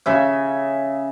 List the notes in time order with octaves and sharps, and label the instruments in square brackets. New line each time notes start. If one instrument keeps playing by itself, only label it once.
[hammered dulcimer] C#3 E5 G#5